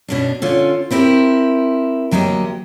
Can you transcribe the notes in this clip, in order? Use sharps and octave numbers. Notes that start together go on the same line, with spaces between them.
B2 C#4 D4
D3 C#4 F4
B3 C4 E4 F#4 G4 A#4
D2 F#3 A#3 G4 D#5